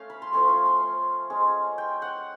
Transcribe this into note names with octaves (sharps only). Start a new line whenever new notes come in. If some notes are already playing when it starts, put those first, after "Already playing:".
Already playing: A3 C#4 F5
B5
C6
F3 A3 C#4 C#6
C6
C6
G#3 C#4 F4
G5
F#5